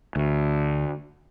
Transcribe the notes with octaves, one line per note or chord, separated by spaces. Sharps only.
D2